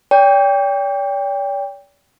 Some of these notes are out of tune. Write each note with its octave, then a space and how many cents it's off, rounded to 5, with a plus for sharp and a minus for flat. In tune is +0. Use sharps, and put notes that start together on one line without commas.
D5 -45 G5 +20